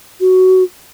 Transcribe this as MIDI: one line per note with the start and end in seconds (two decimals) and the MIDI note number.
0.20 0.63 66